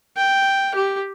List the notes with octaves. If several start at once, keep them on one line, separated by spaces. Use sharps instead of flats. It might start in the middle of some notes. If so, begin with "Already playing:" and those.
G5
G4